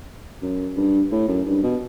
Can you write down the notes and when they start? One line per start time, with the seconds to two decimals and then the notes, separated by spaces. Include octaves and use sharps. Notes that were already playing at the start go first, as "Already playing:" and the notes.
0.42 F#2
0.76 G2
1.11 A2
1.28 F#2
1.46 G2
1.63 B2